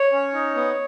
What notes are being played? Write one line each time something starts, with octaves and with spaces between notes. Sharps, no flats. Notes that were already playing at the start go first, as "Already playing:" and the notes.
Already playing: C#5
C#4
D#4
B3